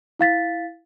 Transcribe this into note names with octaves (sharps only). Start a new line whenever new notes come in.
E4 F5 A6 B6